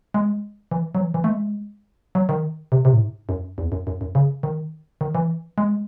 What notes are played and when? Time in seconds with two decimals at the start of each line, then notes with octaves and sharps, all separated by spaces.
0.14 G#3
0.71 E3
0.95 F#3
1.00 E3
1.14 E3
1.24 A3
1.29 G#3
2.15 F#3
2.29 D#3
2.72 C3
2.85 C3
2.93 A2
3.01 G#2
3.29 F#2
3.58 E2
3.72 F#2
3.87 F#2
4.01 F#2
4.15 C#3
4.43 D#3
5.01 D#3
5.15 E3
5.58 G#3